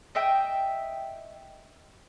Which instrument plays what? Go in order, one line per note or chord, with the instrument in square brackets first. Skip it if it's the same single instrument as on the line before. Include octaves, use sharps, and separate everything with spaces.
[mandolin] D#5 E5 G5